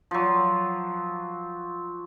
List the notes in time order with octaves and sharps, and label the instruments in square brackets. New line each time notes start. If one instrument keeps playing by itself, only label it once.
[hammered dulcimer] F3 F#3